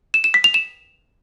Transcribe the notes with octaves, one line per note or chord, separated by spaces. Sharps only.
E7
E7
B6
F7
E7